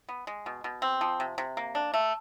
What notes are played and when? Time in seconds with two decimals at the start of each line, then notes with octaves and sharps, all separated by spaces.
0.09 B3
0.27 G#3
0.46 B2
0.64 B2
0.82 C4
1.01 F3
1.20 C3
1.38 C3
1.57 A#3
1.75 D4
1.94 A3